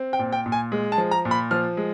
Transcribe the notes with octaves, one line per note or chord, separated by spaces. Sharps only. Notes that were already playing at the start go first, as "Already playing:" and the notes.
Already playing: C4
G5
A#2
G5
A#2
G#5
G#3
A5
F3
A#5
A#2
B5
F3 F6
G#3